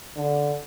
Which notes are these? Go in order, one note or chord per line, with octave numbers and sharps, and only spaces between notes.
D3